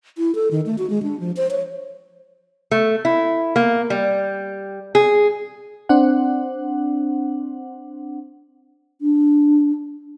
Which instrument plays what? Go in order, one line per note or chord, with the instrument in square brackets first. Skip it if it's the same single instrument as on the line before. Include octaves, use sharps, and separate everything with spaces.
[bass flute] E4
A4
D#3
A3
F#4
G#3
D4
F3
C5
C#5
[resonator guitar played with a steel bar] A3
E4
A#3
G3
G#4
[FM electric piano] C4 D4 C5 F#5
[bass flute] D4